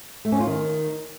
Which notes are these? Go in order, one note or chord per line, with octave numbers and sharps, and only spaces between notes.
A3
C#4
F4
D#3